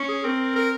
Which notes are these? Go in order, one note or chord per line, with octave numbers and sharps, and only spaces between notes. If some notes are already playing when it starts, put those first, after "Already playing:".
Already playing: C#4
G#4
C4 A#4
A#4